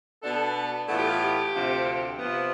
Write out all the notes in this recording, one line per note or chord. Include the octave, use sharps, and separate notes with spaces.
B2 B3 D4 A4
A2 E3 B3 F4 A4
G4
F4
G4
D2 C3 F3 C4
C3 F3 B3